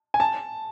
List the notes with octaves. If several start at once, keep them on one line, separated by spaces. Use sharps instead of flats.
G#5
A5